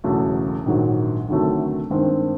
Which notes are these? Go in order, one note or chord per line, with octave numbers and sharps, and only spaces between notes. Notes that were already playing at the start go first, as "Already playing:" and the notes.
E1 E2 C#3 F#3 A3
A#1 G#2 D#3 F#3
D2 C3 D#3 F#3 A3
G2 D#3 G#3 C4